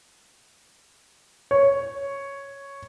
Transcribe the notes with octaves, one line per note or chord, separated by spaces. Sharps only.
C#5